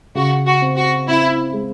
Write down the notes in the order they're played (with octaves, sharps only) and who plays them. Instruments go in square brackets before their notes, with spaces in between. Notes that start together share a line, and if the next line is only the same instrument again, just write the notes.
[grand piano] C#3 [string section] F#4
[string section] F#4
[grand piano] C4
[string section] F#4
[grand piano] C4 [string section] E4
[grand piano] G#3